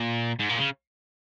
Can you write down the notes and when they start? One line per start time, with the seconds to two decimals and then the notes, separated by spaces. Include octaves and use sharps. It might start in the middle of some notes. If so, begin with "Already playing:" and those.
Already playing: A#2
0.39 G#2
0.49 A#2
0.59 C#3